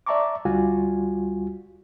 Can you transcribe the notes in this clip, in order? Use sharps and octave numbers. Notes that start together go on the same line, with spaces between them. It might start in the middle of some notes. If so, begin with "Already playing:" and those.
D5 E5 A5 A#5 C#6 D6
D2 G3 F4 F#4 G#5